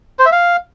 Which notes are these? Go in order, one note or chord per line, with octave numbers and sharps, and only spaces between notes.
C5
E5
F5